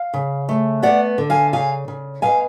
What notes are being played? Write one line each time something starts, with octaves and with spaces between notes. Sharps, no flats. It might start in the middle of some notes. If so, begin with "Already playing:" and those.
Already playing: F5
C#3
A3
B3 D5 F#5
D3
F5 G#5
C#3 F5 G#5
C#3
B2 F5 G#5